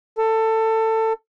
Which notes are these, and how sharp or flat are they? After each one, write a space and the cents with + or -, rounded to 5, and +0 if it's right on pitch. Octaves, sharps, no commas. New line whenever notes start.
A4 +20